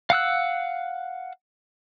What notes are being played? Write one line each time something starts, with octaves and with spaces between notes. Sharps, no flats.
F5 F#5 E6 F#6